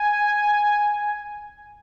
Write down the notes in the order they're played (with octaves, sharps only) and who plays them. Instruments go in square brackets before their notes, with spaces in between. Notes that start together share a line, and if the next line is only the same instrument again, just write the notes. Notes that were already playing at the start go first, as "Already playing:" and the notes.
Already playing: [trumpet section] G#5